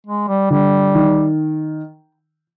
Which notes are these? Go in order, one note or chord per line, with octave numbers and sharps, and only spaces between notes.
G#3
G3
D3 G3
D#3